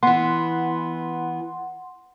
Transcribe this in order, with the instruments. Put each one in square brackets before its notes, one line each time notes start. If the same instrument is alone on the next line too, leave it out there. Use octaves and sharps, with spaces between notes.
[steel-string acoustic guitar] E3 B3 [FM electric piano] F#5 C6